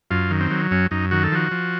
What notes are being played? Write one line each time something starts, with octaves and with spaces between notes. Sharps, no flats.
F#2 F4
D#3
C4
F#3
F#2 C#4
F#2 D#4
D#3 F#4
A4
F3 F#4
F3